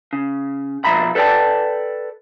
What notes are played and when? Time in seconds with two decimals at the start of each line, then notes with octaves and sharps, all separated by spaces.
0.13 C#3
0.85 B2 F3 E5 A#5 B5
1.15 A4 B4 D5 E5 G5 A5